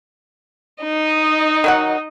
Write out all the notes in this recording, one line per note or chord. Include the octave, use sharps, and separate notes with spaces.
D#4 D#5
D#3 F#3 F#5